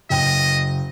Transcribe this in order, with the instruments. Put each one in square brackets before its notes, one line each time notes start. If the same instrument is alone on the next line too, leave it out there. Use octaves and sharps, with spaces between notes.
[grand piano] F#1 G5 [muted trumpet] D#5